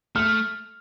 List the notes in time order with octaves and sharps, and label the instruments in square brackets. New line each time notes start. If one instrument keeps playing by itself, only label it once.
[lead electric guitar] A3 [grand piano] F6